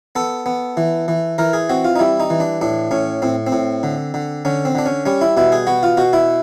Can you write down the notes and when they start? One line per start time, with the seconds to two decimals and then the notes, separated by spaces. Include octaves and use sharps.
0.16 B3 A4
0.46 B3
0.77 E3
1.08 E3
1.38 E3 A#4
1.53 G#4
1.69 C4 F#4
1.85 F4
1.96 D#4
1.99 G3 E4
2.20 D#4
2.30 E3
2.40 D4
2.62 A2 D4
2.91 A2 C#4
3.22 A2 C4
3.47 C4
3.52 A2
3.83 D3
4.14 D3
4.45 D3 C#4
4.65 C4
4.75 D3 D4
4.86 C#4
5.06 G3 C#4
5.21 E4
5.37 B2 E4
5.52 G#4
5.67 B3 F#4
5.83 F4
5.97 B2 F#4
6.13 E4